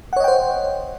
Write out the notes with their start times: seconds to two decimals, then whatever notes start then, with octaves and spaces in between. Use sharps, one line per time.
0.13 F#5
0.16 C#5
0.20 D#5
0.24 G5
0.28 C5